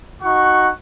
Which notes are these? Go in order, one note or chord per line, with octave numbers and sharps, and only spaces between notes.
D#4 F#4 F#5 C#6